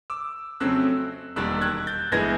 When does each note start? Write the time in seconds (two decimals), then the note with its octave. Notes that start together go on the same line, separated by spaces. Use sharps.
0.10 D6 E6
0.60 F2 C#3 F#3 A3 C4 E6 F#6
1.36 E1 D#2 D#3 G3 E6 F#6
1.61 F#6 G#6
1.87 G6 A6
2.12 G1 E3 G#3 B3 G#6 A#6